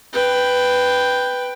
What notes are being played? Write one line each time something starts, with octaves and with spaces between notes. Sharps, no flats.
B4 G5